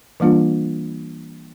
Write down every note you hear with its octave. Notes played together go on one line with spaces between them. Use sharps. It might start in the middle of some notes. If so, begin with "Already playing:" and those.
E3 G3 A#3 D4 F4